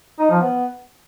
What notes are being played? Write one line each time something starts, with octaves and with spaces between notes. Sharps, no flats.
D#4
F3
B3